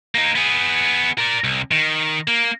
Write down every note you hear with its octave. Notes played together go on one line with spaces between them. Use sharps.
A#3 D#4
B3 G#4
A#4 D5
C2
D#3
A#3